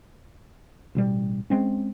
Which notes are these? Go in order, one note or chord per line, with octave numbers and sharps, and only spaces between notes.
A1 B2 G3
G#3 C4 C#4